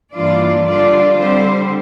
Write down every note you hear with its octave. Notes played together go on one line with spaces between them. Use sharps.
G2 E3 A#3 D4 F4 D5
D3 G3 D4 F4 D5
D3 G3 C4 C5